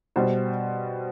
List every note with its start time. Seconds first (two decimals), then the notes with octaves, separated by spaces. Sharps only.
0.16 B2 G3 C5